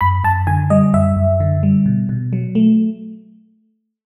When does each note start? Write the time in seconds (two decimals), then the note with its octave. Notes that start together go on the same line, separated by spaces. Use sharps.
0.01 F#2 B5
0.24 F#2 A5
0.47 D3 G#5
0.70 G3 D#5
0.94 F#2 E5
1.16 F#2
1.40 D3
1.63 G3
1.86 B2
2.09 B2
2.33 F#3
2.55 A3